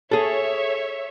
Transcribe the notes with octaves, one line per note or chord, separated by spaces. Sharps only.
G#4 A4 C#5 E5